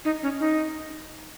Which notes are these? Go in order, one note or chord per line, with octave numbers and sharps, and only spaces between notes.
D#4
C#4
D#4